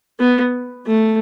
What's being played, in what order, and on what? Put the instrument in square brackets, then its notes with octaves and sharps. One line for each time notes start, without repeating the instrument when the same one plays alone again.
[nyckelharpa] B3
A3